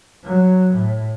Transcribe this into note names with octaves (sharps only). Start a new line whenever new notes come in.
F#3
A2